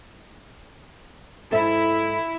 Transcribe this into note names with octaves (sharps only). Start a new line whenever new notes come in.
G#2 E4 A4 E5